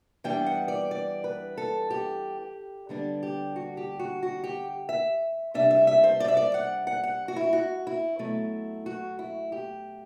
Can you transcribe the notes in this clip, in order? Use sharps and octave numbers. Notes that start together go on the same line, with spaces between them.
E3 G3 B3 D4 G5
F#5
D5
D5
B4
A4
G4
D3 G3 B3 D4
G4
F#4
G4
F#4
F#4
G4
E5
C3 G3 D4 E5
E5
E5
C5
D5
E5
D5
F#5
F#5
F#5
F#4
E4
F#4
E4
B2 F#3 A3
F#4
E4
G4